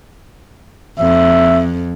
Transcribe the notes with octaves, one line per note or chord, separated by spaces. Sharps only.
F2 E5